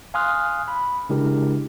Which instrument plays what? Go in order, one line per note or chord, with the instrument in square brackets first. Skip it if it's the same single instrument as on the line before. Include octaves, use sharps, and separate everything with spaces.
[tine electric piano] F5 G#5 C6 D#6 F6 F#6
B5
C#3 G#3 D4 E4 G4 A#4